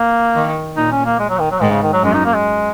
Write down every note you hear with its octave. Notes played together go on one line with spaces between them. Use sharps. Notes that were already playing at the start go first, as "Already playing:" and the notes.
Already playing: A#3
D#3
A#2 D#4
C#4
A#3
G#3
F#3
D#3
F#3
G#2 D#3
C#3
D#3
F#3
F#2 G#3
D#4
A#3
G#3